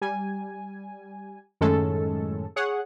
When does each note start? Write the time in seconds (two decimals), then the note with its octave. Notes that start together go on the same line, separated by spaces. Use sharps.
0.02 G3 G#5
1.61 F#2 A2 D#3 G#3 C#4 A4
2.56 G#4 C#5 F#5